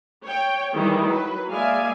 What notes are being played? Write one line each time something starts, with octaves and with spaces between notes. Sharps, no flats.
C#5 G5
D#3 E3 G3 G#3
F#3 B4
G#3 A#3 D5 E5 F5 G#5